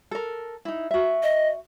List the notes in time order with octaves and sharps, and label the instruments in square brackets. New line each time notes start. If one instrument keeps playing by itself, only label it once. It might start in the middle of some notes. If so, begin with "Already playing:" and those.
[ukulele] A4 A#4
D#4 E4
F#4 E5
[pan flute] D#5